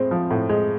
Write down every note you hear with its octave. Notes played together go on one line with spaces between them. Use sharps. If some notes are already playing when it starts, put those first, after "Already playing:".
Already playing: A2 G#3 C4
F3
A2
G#3